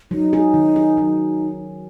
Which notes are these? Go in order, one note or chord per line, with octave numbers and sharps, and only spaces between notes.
F#3 D#4
G#4
D#3
G#4
F#3